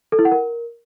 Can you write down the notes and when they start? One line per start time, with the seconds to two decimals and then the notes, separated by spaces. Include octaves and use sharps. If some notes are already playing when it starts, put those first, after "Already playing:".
0.12 A4
0.19 E4
0.25 F#5
0.32 A#4